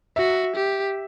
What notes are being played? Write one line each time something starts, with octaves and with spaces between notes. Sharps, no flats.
F#4 E5
G4